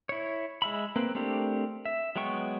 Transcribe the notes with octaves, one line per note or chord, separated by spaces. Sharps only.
E4 C#5
G#3 E5 B5
A#3 C4 B4
A3 C4 D4 G4 A#4
E5
F#3 G#3 B3 G5 C#6